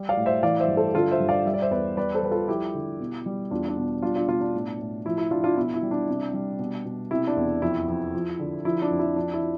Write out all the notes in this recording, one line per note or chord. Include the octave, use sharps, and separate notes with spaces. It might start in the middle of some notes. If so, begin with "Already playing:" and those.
Already playing: G3
D5 F5
A2
C5 E5
E3 D5 F5
C5 E5
G2
A4 C5
D3 F4 A4
C5 E5
G2
D5 F5
G3 E5
D5
C5 E5
E2 B4 D5
G3 B4 D5
A4 C5
G3 B4
F4 A4
F3 E4 G4
D3
B2
G3
E2 D4 F4
D4
B2
G3 D4 F4
D4 F4
B2 D4 F4
D4
A2
A2
F3 E4
E4
F3 D4 F4
D4 F4
B2 E4
E4
G3
D4
C3
G3
B2
B2
C3 E4
D4
E2
F2 E4
F2
F3
D3
F3 E4
D4
F2
E4
F3 D4
E4
F3